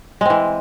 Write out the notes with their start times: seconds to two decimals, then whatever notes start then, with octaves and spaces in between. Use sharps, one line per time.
0.21 G#3
0.25 C4
0.30 E3